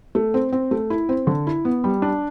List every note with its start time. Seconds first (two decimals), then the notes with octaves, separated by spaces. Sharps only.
0.15 A3
0.34 C4
0.52 C4
0.71 A3
0.90 E4
1.09 C4
1.27 D3
1.47 E4
1.65 B3
1.84 G3
2.02 D4